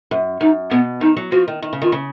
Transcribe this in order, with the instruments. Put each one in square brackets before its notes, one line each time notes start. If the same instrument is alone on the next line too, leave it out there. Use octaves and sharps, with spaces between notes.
[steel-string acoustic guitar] F#2
[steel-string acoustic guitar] F#2 [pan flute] D#4
[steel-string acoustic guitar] B2 [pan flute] B3
[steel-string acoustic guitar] D#3 [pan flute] D#4
[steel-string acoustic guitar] F#3
[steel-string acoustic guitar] F3 [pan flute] F#4
[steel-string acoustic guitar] D#3
D#3
C#3
[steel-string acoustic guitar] D#3 [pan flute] F4
[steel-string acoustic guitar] C#3